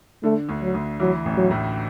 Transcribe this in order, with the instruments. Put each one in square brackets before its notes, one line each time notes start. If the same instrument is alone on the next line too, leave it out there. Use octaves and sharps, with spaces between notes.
[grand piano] D3 [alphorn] A3
[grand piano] D2
[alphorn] F#3
[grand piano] D2
[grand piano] E3 [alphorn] F#3
[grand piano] A1
[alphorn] F#3
[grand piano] A2